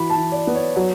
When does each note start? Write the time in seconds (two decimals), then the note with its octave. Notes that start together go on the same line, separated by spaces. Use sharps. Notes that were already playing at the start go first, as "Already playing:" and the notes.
Already playing: E3 F#4 B5
0.10 A5
0.17 E3
0.32 D5
0.47 B3
0.55 C#5
0.76 F#3 F#4